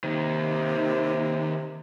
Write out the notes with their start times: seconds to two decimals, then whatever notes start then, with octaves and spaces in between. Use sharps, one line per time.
0.04 D#2 C3 D#3